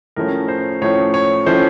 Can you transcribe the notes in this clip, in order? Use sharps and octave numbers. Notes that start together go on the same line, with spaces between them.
A2 F3 A3 C#4 A#4
C5
A2 F3 A3 C#4 C#5
C#5
A2 F3 A3 C#4 C5